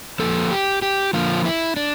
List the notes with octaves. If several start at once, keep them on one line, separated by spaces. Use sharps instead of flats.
F2 D3 F3 A#3 A4
G4
G4
F2 D3 F3 A#3 F4
E4
D4